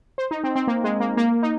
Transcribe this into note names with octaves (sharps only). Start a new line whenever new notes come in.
C5
D#4
C4
C4
A#3
G#3
A#3
A#3
D#4